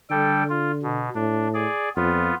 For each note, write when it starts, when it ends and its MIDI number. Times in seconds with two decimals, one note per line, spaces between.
0.10 1.04 50
0.10 0.43 55
0.10 0.43 69
0.10 0.43 79
0.50 0.72 65
0.83 1.09 47
1.15 1.66 45
1.15 1.48 62
1.54 1.89 68
1.54 1.89 74
1.96 2.31 41
1.96 2.35 59
1.96 2.35 65